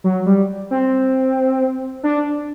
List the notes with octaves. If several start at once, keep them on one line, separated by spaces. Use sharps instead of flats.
F#3
G3
C4
D4